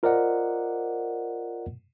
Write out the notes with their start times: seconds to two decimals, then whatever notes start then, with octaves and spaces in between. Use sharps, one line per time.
0.03 F4 A#4 C5 D5 D#5 F#5